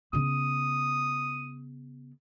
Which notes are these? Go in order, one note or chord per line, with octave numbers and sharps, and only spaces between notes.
C#3 B3 D#6